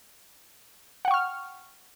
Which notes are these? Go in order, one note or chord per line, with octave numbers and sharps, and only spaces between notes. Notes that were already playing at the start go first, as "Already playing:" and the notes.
F#5 G5 C#6 F6